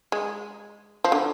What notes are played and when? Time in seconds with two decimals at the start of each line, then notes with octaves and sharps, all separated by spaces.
0.12 G#3
1.04 F3
1.12 D3